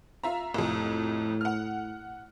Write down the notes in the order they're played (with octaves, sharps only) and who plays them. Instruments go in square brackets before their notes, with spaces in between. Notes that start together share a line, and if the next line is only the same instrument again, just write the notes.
[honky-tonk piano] F4 E5 A#5
[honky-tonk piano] C2 F2 [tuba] A2
[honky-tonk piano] F#5 F6